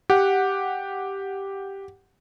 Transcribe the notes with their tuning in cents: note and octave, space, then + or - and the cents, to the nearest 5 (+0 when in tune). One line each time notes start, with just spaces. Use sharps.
G4 +0 F#5 +0